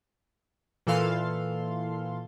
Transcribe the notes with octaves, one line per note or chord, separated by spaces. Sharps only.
A#2 E3 A4 F5 C6